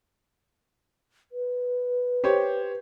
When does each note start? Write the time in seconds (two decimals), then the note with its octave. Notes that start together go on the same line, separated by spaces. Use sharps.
1.32 B4
2.24 G4 C5 C#5